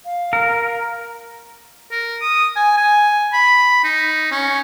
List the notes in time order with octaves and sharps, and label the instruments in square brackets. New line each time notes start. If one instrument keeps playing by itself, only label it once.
[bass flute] F5
[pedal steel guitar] A#4
[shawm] A#4
D#6
G#5
G#5
B5
D#4
C#4